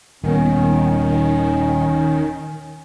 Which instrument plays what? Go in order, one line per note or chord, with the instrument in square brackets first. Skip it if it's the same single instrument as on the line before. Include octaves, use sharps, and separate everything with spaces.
[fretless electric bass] D#1 B3 [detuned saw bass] D#3 [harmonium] C#4